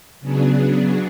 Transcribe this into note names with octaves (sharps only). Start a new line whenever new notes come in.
C#3 F#3 B3 D4 G#4